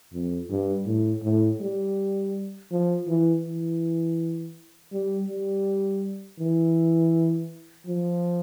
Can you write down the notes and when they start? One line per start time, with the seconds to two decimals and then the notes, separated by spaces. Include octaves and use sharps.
0.13 F2
0.50 G2
0.86 A2
1.23 A2
1.60 G3
2.71 F3
3.07 E3
3.44 E3
4.92 G3
5.28 G3
6.40 E3
7.87 F3